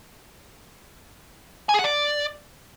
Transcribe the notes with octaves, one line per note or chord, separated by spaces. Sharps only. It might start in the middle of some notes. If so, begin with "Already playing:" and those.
G#5
G#4
F#5
D5